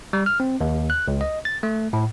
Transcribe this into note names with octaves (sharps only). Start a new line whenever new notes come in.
G3
F6
C4
D#2
F#6
C#2
D#5
A6
A3
A2